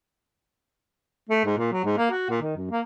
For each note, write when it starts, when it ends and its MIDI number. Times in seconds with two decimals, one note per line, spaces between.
1.30 1.42 57
1.45 1.57 44
1.58 1.69 46
1.72 1.83 54
1.85 1.94 44
1.97 2.09 58
2.11 2.26 66
2.29 2.39 46
2.42 2.56 51
2.57 2.68 42
2.71 2.81 58